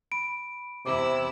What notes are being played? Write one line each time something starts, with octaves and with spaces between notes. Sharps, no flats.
B5 D7
E2 C3 E4 D6 E6